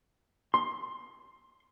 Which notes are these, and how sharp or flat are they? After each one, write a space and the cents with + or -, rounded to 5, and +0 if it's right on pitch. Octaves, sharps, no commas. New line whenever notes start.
C6 +20